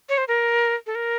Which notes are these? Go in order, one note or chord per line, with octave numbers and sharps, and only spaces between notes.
C#5
C5
A#4
A4
A#4